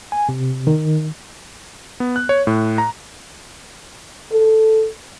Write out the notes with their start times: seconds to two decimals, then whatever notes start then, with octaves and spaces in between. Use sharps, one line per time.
0.12 G#5
0.29 C3
0.67 D#3
2.00 B3
2.16 F#6
2.29 C#5
2.47 A2
2.78 A#5
4.33 A4